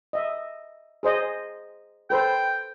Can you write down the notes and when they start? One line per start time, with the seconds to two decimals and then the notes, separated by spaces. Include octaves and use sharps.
0.13 D#5 E5
1.03 G#4 C5 D#5
2.10 A4 B4 C5 G5